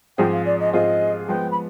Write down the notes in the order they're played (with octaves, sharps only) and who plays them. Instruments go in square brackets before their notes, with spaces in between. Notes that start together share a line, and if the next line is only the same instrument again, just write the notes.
[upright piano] G#2 F3 C4 F4 G#4 [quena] G5
[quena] F5
D5
D#5
[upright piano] G#2 F3 C4 F4 G#4 [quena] D#5
[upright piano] F3 G#3 B3 [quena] G5
[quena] B5